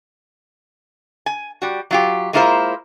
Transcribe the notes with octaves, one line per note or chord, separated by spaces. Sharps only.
G#5
G3 F#4
F#3 F4 G4
G#3 A#3 E4 F4 A#4 C5